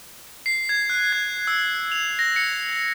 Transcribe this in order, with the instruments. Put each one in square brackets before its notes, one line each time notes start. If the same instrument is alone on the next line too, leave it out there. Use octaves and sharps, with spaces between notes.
[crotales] C7
G#6
F#6
G#6
E6
F7
A#6
C#7